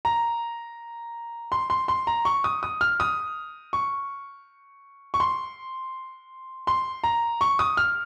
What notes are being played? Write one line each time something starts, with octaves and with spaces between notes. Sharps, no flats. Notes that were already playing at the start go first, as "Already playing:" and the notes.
A#5
C6
C6
C6
A#5
C#6
D#6
D#6
F6
D#6
C#6
C#6
C6
C6
A#5
C#6
D#6
F6